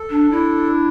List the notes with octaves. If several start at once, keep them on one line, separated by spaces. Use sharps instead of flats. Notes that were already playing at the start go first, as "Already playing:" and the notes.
Already playing: A4
D4
D4 E4